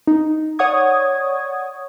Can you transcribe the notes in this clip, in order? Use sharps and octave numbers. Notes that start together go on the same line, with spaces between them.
D#4
C#5 D5 F#5 C#6 D#6 G#6